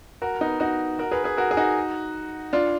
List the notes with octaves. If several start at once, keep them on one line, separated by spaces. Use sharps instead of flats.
F#4 A#4
B3 D#4
D#4 F#4
F#4 A#4
G#4 B4
G#4 B4
F#4 A#4
G#4
D#4 F#4
D4 F4